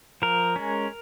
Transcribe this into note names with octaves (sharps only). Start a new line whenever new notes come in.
F3 A#4
G#3 C#4